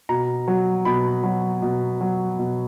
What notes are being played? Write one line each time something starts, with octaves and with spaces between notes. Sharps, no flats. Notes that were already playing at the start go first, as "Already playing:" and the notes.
B2 A#5
F#3
B2 B5
F#3
B2
F#3
B2